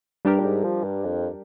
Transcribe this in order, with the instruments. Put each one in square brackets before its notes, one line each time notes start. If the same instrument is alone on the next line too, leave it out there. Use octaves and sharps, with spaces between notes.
[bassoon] G2 [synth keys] G3 D4 G4 A#4
[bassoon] A#2
G#2
F3
G2
F2